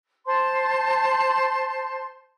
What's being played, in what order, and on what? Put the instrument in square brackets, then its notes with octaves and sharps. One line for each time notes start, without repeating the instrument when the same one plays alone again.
[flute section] C5 A5 C6